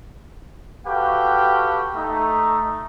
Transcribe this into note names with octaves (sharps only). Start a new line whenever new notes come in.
F#4 G4 A4 B4 F5 G5
A3 D#4